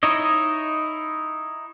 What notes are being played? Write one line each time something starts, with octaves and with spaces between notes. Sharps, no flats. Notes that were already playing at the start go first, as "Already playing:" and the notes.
D#4 E4 C#5 D#5